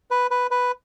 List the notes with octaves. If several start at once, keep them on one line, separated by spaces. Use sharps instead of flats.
B4
B4
B4